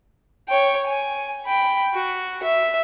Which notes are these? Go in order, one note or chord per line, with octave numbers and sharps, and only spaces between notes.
C#5 G5
G#5
G5 B5
F#4
E5